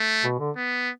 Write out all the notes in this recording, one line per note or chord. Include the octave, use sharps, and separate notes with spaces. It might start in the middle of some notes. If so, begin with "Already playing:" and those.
Already playing: A3
B2
D3
B3